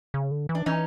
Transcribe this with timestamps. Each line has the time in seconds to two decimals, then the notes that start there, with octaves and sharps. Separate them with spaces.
0.14 C#3
0.31 D3
0.49 E3
0.55 D4
0.66 E3 C#4 D#4